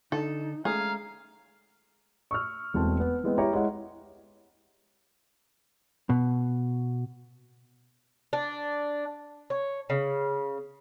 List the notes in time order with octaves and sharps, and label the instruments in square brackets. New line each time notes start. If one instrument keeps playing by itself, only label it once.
[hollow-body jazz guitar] D3 [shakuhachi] D#4 [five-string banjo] A4
[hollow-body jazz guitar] G#3 A3 C#4 [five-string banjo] G#4 [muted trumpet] F5 [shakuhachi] A#5
[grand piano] C#6 E6 F6
E1 E2 A3 C4 A5
B3
E3 G#3 B3 C4
E4 G4 C#5 E5 A#5
G#3 E4 C#5 F#5
[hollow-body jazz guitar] B2
[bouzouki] D4
C#5
C#3